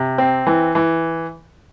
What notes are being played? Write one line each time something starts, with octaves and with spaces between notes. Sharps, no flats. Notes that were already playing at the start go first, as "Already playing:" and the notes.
Already playing: C3
C4
E3
E3